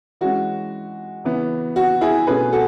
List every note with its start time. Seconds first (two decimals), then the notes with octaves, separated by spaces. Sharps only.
0.21 E3 G#3 C#4 F#4
1.24 C#3 E3 B3
1.76 F#4
2.01 E4 G#4
2.27 B2 A3 C#4 G#4 B4
2.53 F#4 A4